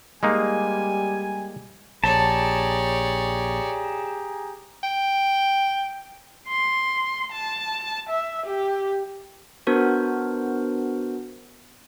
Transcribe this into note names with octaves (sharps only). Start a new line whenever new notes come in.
G3 G#3 A#3 D#4 G#5
A#1 G4 G#4 C#5 D5 A5 A#5
G5
C6
A5
E5
G4
B3 D4 F#4 A#4 C5